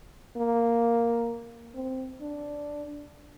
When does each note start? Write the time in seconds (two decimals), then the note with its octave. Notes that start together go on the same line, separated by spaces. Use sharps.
0.36 A#3
1.74 C4
2.21 D4